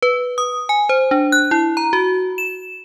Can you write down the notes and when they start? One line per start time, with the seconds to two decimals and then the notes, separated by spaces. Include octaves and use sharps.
0.02 B4
0.38 D#6
0.69 G#5
0.89 C5
1.11 D4
1.32 F#6
1.51 E4
1.77 A#5
1.93 F#4
2.38 E7